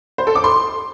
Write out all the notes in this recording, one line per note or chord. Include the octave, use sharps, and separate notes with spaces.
C5
A4
D6
C6